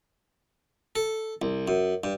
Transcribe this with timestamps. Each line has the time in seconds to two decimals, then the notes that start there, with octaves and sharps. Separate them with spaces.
0.96 A4
1.42 C2
1.68 F#2
2.04 G2